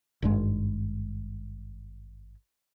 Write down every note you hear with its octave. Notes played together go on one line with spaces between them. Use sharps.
G#1 G2 G#3